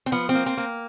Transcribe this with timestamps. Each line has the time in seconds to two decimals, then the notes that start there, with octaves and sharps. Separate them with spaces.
0.06 C4
0.12 F3 B3
0.29 C4
0.35 A#3
0.46 C4
0.57 A#3